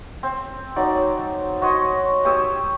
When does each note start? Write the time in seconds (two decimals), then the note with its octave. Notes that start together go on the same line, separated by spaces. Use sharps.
0.23 C4
0.76 F#3 D#4 D5
1.62 F#4 C#5 D#5 C6
2.25 G4 C#5 D#6 E6